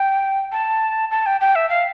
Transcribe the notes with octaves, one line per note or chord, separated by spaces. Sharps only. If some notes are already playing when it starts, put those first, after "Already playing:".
Already playing: G5
A5
A5
G5
G5
E5
F5